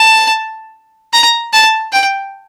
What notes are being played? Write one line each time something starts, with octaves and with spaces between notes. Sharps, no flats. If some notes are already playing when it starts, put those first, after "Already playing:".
Already playing: A5
A#5
A5
G5